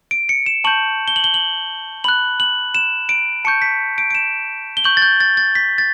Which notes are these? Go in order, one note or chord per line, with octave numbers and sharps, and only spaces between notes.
D7
C#7
E7
A5 C#6 G6 F#7
G7
F#7
G7
F#7
B5 F#6 F#7
F#7
E7
D7
A5 C#6 G6 C#7
B6
D7
D7
E7
G7
C#6 G6 F#7
A6
G6
A6
A6
B6
A6